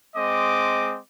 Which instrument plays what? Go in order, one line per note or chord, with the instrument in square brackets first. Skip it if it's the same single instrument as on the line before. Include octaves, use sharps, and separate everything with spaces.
[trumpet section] G#3 C4 D#5 D6